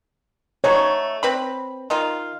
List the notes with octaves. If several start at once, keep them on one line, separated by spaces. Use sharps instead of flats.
A3 D#4 F#4 C#5
C4 B4 B5
D#3 D#4 F4